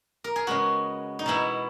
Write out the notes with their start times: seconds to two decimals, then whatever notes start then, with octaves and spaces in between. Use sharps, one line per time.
0.24 A#4
0.36 G#4
0.47 C#3 G#3 B3 F#4
1.19 D#4
1.26 B2 G#3 B3 E4